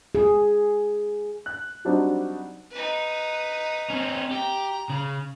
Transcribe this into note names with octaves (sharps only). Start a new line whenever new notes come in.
G#4
F#6
F#3 G3 C4 D4 D#4 F#4
D#4 B4
C4 C#4
G4 A#5
C#3